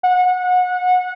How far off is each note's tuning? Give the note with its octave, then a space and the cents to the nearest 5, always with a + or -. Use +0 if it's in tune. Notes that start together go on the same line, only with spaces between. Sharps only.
F#5 -25